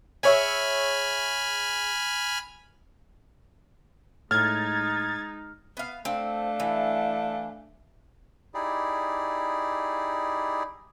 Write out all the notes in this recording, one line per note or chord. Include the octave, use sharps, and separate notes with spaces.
G#4 C#5 E5 G#5 B5 F6
A2 G#3 D#4 F6 G#6 A6
B3 F5
A3 C4 D4 F5
E3
D#4 E4 G4 G#4 D5